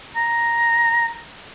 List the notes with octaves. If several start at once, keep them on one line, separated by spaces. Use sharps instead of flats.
A#5